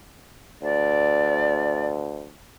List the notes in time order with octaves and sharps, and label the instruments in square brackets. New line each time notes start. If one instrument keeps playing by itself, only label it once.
[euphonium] D2 [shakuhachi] D5